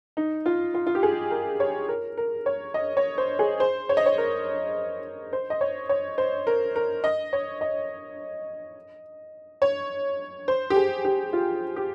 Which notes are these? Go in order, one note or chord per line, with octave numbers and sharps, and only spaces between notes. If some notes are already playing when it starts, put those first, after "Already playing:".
D#4
F4
F4
F4
G4
G#4
A#4
C#5
A#4
A#4
C#5
D#5
C#5
C5
G#4
C5
C#5
D#5
C#5
A#4
C5
D#5
C#5
C#5
C5
A#4
A#4
D#5
C#5
D#5
C#5
C5
G4
G#4
G4
F4
G4